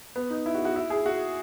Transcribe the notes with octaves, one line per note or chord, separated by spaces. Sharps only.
B3
D#4
E4
F#4
F#4
E4
G#4
F#4